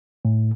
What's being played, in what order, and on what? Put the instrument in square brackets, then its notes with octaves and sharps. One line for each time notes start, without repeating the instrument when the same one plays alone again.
[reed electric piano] A2